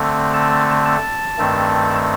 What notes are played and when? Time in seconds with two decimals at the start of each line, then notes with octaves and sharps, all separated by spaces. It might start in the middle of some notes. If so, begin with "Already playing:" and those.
Already playing: D3 A3 C4
0.34 A5
0.85 A5
1.38 G2 D#3 A3 C4